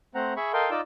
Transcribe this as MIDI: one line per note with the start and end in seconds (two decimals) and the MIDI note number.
0.15 0.33 57
0.15 0.33 60
0.15 0.33 72
0.15 0.33 78
0.15 0.33 82
0.36 0.52 68
0.36 0.52 76
0.36 0.52 83
0.36 0.52 85
0.53 0.70 69
0.53 0.70 70
0.53 0.70 75
0.53 0.70 77
0.53 0.70 79
0.53 0.70 84
0.71 0.81 63
0.71 0.81 65
0.71 0.81 74
0.71 0.81 75
0.71 0.81 86
0.71 0.81 88